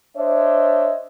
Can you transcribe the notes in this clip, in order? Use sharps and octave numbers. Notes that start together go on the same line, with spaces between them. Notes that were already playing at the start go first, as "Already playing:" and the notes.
D4 C5 C#5 D#5 E5